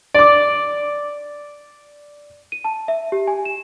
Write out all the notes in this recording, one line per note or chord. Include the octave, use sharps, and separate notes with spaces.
D5 D6
D#7
A5
E5
G4
G#5
E7